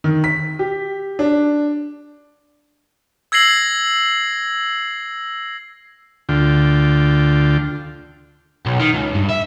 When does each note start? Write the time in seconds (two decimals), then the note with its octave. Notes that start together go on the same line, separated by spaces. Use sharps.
0.04 D#3
0.24 B6
0.59 G4
1.19 D4
3.32 E6 G#6 A#6 C7 F#7
6.29 D2 D3 F4 G5
8.66 B1
8.80 D#3
8.94 C#2
9.15 G2
9.30 E5